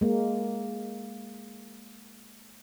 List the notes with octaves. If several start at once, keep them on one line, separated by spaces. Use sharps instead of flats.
G#3 A#3